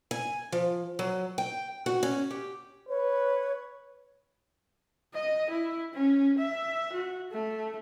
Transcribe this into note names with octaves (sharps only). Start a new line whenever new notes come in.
G#5
F3
F#3
G5
F#4
C#4
G4
B4 C#5
D#5
E4
C#4
E5
F#4
A3